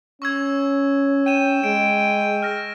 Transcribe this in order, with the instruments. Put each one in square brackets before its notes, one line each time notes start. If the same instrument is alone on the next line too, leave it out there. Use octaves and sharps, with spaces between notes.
[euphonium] C#4 [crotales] C#6 E6 G#6
[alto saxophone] G5 [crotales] D#7 E7
[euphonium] G#3 [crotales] D7
[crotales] F6 A#6